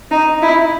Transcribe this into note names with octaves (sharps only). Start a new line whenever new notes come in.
D#4
E4